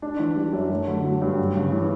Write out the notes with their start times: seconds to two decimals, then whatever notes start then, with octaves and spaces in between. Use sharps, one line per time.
0.02 D4
0.19 E3
0.36 G3
0.53 F#2
0.70 A3
0.87 D3
1.04 F#3
1.22 G2
1.39 G3
1.56 C#3
1.72 E3